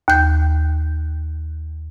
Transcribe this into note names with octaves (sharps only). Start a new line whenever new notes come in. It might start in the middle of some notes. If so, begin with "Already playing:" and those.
D#2 G6